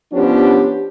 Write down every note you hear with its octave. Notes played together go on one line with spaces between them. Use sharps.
F3 B3 C#4 D4 G4